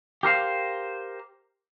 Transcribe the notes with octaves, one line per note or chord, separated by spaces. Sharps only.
G4 A#4 C5 F5